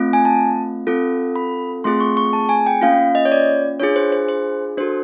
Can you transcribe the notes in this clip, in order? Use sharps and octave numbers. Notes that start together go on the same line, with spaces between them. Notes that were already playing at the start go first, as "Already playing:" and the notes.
Already playing: A3 C4 F4
G#5
A5
C4 F4 A4
B5
A3 C4 F4 G#4 C6
C#6
C#6
A5
G#5
G5
A#3 C#4 F4 F5
D#5
C#5
D5
D4 F4 G#4 C#5
C5
C5
C5
D4 F#4 A4 C5